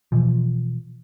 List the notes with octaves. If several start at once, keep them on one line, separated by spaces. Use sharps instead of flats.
B2 E3 F3